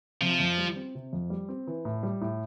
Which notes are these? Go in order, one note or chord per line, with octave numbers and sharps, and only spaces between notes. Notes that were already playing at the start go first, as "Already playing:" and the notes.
C3 F3
F2
G3
C4
C3
F2
G3
C4
E3
A2
G3
A2